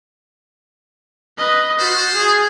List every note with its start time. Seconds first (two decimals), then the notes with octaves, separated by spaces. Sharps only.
1.38 B4 D#5
1.79 F4 F#4 C5
2.14 G#4